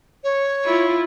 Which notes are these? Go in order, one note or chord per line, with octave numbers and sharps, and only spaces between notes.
C#5
E4 F4